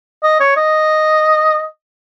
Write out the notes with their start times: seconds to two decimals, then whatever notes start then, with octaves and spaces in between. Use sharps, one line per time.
0.23 D#5
0.40 C#5
0.57 D#5